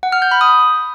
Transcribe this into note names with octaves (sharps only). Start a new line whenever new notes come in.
F#5
F6
G6
B5
D#6